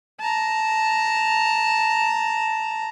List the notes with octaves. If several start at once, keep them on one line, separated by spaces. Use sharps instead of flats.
A5 A#5